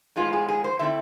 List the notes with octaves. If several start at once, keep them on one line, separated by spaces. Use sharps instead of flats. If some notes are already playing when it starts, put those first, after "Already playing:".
A2 F3 G#3 B3 F4
G#4
G#4
C5
D3 A3 C4 E4 E5